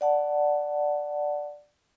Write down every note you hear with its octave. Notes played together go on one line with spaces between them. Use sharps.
D5 F#5 A5